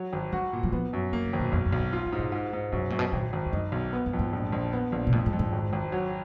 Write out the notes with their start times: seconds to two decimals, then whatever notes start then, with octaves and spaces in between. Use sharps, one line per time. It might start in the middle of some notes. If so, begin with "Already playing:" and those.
Already playing: F#3
0.13 G#1
0.32 F#3 F#4
0.53 A#2
0.63 F#3
0.72 F3 B3
0.93 F#2
1.13 F3 A#3
1.26 C#3
1.33 G#1
1.40 B2
1.52 B1 F2
1.66 F#2
1.73 B1
1.80 G#2
1.93 G#2 F4
2.06 A#2
2.12 G#2
2.19 B2
2.32 G#2
2.53 G#2
2.72 F#2 C#3
2.81 B2
2.90 F#2 A#2
2.99 B2
3.13 G#1 A#2
3.33 G#1
3.46 F2
3.52 F#2 D#4
3.72 B1
3.93 B3
4.06 F#2
4.13 F2
4.19 G#2
4.33 A#1
4.52 A#1
4.73 B3
4.92 A#1
5.07 B2
5.12 F2 A#2
5.26 G#2
5.33 F2
5.39 G#2
5.53 G#1
5.73 G#1
5.92 F#3